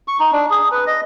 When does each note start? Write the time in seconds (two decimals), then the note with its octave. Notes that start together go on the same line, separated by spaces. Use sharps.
0.08 C#6
0.20 D#4
0.32 D4
0.50 G#4
0.72 B4
0.87 D#5